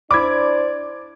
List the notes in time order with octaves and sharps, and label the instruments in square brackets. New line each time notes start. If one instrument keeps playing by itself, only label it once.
[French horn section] D4 C5 [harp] E4 B5 [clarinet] D5 [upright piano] D6 G#6